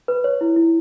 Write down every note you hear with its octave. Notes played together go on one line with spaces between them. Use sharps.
B4
C#5
E4
E4